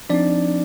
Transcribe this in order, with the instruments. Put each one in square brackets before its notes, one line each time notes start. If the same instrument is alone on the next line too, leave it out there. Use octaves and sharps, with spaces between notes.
[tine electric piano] F3 C4 D4 D#4 D5